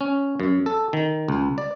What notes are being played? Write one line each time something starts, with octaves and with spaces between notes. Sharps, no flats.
C#4
F#2
A4
D#3
C#2
D5